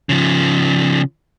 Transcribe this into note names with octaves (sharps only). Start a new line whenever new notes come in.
C#3 F3